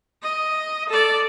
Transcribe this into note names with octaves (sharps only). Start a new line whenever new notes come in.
D#5
A4 D5